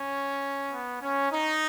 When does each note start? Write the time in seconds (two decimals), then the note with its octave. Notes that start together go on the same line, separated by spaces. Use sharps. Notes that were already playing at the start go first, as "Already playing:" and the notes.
Already playing: C#4
0.70 B3
1.00 C#4
1.30 D#4